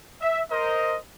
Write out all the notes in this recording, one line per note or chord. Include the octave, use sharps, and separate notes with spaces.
E5
A#4 C5 D#5